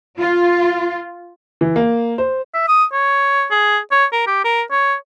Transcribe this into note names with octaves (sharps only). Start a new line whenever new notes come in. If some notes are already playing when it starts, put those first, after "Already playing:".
F4
E3
A#3
C5
E5
D#6
C#5
G#4
C#5
A#4
G4
A#4
C#5